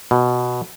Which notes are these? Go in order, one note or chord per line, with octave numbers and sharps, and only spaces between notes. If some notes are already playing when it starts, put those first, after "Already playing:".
B2